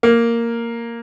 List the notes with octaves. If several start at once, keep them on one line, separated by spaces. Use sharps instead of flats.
A#3